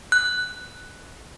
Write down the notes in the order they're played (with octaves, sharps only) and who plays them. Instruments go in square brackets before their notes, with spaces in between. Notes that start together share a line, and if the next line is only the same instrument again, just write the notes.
[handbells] F#6